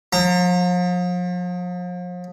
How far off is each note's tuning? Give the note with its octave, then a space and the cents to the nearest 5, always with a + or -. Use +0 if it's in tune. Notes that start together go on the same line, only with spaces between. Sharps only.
F3 +40 A#5 -30